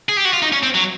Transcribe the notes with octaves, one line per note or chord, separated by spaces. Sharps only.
G#4
G4
F#4
F4
D#4
C#4
C4
F#3